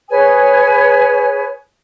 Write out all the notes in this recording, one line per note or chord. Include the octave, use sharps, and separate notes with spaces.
G#4 B4 C#5 G#5